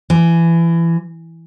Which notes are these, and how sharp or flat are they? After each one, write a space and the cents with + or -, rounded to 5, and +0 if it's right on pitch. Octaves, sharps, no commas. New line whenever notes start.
E3 +25